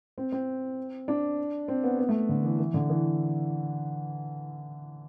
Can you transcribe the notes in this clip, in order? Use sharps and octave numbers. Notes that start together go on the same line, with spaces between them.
C4
C4
D4
C4
B3
B3
A3
D3
E3
E3
D3
E3